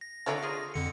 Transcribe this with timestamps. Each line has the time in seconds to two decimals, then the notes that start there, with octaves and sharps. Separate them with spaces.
0.01 A#6
0.26 D3 F3 A3 D#4 C#5 D5
0.42 F4 G#4
0.74 F2 D3 C#7